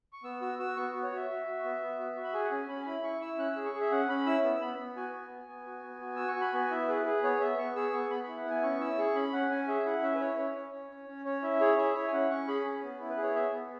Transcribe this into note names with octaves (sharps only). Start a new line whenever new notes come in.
C#6
B3 E6
F#4 E6
F#4 E6
B3 C#6
F#4
C#5
F#4 E5
F#4
F#4
B3
B3
F#4
F#4
B5
G#4 G#5
F#5
C#4 G#5
C#4 B5
G#5
E4 B5
E4 C#6
E4 E6
C#4 F#6
G#4 E6
C#6
G#4
E5
C#4 F#5
C#4 B5
E4 E6
B3 E6
B3 B5
B3
F#4 G#5
B3
B3
B3
F#4
B3
F#4
F#4 E6
C#6
F#4
B5
B3 G#5
E4 E5
G#4 B4
G#4 B4
B3 C#5
B3 E5
B3 C#6
G#4 E6
B3 C#6
B3 B5
E4 B5
F#5
B3 G#5
C#4 C#6
E4 E6
G#4 C#6
C#4 B5
C#4 F#5
C#4 G#5
G#4 E5
E4 F#5
C#4 E5
B4
E4 C#5
C#4
C#4
C#4
C#4
C#4
C#4 C#5
E4 E5
G#4 C#5
E4 E5
E4 C#5
G#5
C#4 F#5
C#4 C#6
G#4 B5
C#4
B3
E4
B4
G#4
C#5
B3 E5
B3